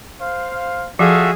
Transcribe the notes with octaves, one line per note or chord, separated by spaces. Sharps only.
C5 F5
F3 F4 F#4 G#4 A4 E5 F5